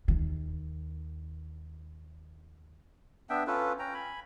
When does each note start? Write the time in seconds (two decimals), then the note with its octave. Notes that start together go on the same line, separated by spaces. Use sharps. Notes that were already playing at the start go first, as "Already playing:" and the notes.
0.08 D#2 D#3
3.30 B3 D4 E5 G5
3.47 C#4 F4 A4 B4
3.79 C#4 G5 A#5
3.94 G#5 B5